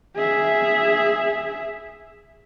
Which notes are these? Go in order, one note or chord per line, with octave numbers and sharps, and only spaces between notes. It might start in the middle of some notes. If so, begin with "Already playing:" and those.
G#4 E5